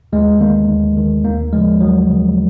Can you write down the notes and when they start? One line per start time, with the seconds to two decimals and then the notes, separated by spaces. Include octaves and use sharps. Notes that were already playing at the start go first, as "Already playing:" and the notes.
0.13 D#2 G#3
0.40 D#3 A#3
0.68 D#2
0.97 D#3
1.24 D#2 A#3
1.53 C#3 F3 G#3
1.80 D#2 F#3
2.09 C#3 F3